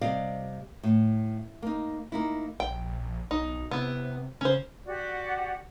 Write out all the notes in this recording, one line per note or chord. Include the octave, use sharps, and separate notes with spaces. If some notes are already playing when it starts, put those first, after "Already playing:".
C3 G3 D5 D#5 F5
A2
A#3 D#4
A#3 D#4 E4
A#1 G5
B1 D#4
C3 B3 E4
C#3 C#4 C5
F#4 G4 D5 F#5